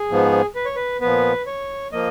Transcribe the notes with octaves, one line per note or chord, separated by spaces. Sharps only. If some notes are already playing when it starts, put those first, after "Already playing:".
Already playing: G#4
G#2 F3 B3
B4
C#5
B4
A#2 F3 B3 B4
C#5
F3 A#3 D#5